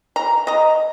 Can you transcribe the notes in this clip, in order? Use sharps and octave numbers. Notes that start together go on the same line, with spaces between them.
A#5
D#5 A#5